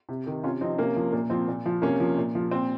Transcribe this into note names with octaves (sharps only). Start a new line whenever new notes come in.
C3
D#3
C3 C#4 F4
F3 C4 D#4
C3 A#3 C#4
F3
A#2 A#3
F3 C4
A#2
F3
C3 A#3 C#4
F3
A#2
F3
A#2 C4